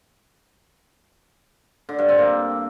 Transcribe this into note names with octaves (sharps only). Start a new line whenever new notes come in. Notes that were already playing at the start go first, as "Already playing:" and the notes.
D3
G2
C4
A#3